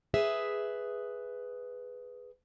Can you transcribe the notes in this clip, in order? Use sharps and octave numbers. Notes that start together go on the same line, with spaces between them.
G#4 B4 E5